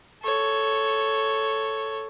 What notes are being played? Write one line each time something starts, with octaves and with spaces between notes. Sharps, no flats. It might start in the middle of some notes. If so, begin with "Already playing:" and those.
A4 C#5